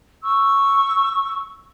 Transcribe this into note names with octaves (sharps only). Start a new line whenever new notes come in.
C#6 E6